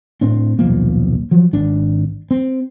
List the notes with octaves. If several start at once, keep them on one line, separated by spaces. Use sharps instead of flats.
A2 C4 D4
D#1 B1 F3 A#3
F3 F#3
G#1 D4
C4